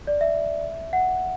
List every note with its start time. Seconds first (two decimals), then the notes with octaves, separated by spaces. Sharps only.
0.07 D5
0.21 E5
0.93 F#5